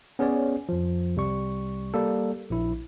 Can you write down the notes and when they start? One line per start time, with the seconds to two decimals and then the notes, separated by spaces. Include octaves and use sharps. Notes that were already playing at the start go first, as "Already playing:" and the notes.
0.19 B3 C#4 G#4 C#5 D5
0.69 F2 F3
1.16 C2 C3 G3 C#6
1.94 G3 A#3 A4
2.50 A#1 E4